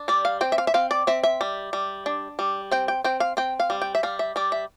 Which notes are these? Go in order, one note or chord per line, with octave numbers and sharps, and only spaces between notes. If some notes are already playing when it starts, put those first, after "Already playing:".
Already playing: D4
G3 D5
F5
C4 G5
E5
F5
E5
C4 F5
D5
C4 E5
E5
G3
G3
D4
G3
C4 G5
G5
C4 G5
F5
C4 G5
F5
G3
G5
E5
G3 F5
E5
G3 D5
E5